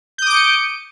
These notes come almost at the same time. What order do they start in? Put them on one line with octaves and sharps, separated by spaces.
G6 D#6 D6 D7 C#7